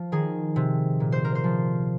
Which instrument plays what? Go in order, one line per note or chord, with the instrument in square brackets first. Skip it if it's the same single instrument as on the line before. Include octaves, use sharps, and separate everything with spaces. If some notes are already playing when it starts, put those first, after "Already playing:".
Already playing: [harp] F3
D#3 G#4
C3
A#2
C5
A#4
C5
F3